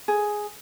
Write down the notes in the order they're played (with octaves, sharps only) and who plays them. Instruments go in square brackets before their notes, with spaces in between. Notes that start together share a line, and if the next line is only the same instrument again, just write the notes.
[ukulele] G#4